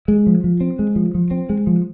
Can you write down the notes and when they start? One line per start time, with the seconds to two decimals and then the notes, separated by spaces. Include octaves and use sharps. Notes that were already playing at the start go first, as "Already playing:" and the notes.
0.08 G#3
0.27 F3
0.44 F3
0.61 C4
0.79 G#3
0.96 F3
1.15 F3
1.31 C4
1.49 G#3
1.67 F3